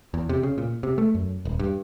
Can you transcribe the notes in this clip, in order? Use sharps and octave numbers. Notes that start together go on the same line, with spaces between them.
E2
C3
C#3
A#2
C3
A3
F#2
D#1
G2